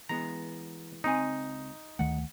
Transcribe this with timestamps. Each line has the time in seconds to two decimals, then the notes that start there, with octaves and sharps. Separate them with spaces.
0.09 E3 G#3 B3 A#5
1.04 C#2 C4 D#4 G#5
1.99 D2 D#3 A3 F#5